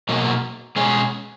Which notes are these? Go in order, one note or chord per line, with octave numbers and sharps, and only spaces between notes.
B2 F#3 A#3
B2 G#3 C#4 G#4